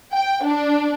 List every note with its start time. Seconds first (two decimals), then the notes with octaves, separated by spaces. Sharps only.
0.12 G5
0.44 D4